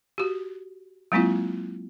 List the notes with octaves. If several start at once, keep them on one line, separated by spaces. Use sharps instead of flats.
F#4 G4
F#3 G#3 A#3 C4 E4 F4